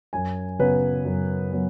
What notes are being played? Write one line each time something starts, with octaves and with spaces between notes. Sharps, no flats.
F#2 G#5
C#3 F#3 B3 B4
F#2
F#3 B3